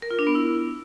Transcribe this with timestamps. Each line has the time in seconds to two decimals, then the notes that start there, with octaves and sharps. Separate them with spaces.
0.02 A#4
0.11 F4
0.19 D4
0.27 B3
0.35 E4